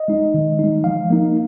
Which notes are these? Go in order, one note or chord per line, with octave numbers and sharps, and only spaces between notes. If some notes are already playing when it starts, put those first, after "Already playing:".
Already playing: D#5
G#3 D#4
D#3
G#3 D#4
F3 F5
A#3 D#4